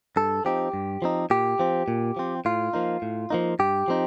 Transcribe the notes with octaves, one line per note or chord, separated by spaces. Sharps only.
G2 A4
F3 C4 D#4 G4
G2
F3 C4 D#4
A#2 G4
F3 C4
A#2
F3 C4
A2 F4
F3 A#3 D#4
A2
F3 A#3 D#4
G2 G4
F3 C4 D#4